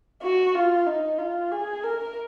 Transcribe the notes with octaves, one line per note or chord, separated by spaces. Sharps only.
F#4
F4
D#4
F4
G#4
A#4